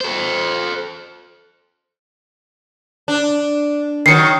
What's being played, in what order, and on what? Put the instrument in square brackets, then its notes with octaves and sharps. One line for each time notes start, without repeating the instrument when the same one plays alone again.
[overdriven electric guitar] A4 C5
[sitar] D4
[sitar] D#3 E3 F#3 [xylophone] C7 C#7